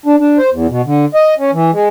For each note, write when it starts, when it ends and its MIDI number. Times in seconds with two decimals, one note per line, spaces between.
0.06 0.16 62
0.19 0.38 62
0.38 0.50 72
0.52 0.67 40
0.69 0.82 47
0.86 1.05 50
1.14 1.34 75
1.39 1.51 61
1.53 1.71 52
1.73 1.89 56